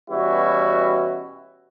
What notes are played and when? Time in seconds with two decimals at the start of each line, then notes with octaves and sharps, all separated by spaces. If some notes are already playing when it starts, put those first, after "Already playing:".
0.11 B2 E3 G3 C#4 E4 F#4